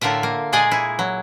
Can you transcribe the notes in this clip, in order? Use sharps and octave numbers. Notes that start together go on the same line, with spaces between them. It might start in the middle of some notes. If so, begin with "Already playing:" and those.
A2 D3 F4 A#4 E5
A#3
A#2 G#3 G#4 D5 D#5 G#5
E4
F#3